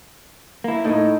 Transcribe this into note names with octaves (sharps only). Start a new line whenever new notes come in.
A#3 E4
A2 D#4 A4